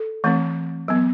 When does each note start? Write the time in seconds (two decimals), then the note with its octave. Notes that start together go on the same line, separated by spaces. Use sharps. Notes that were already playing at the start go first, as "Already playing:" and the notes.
Already playing: A4
0.24 E3 A3 C4
0.88 F#3 B3